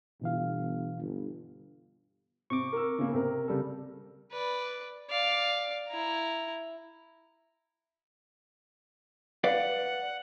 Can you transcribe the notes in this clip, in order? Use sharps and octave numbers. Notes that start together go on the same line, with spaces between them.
G1 B2 E3 F5
G1
C3 C4 C#6 D6
A#4 E6
C#3 A#3
C3 C4 A#4
C#3 G3 A4
B4 D5
D5 F5
E4 A#5
B4 D5 F5 F#5